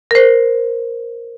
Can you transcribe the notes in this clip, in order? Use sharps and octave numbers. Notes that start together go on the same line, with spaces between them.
A#4 C5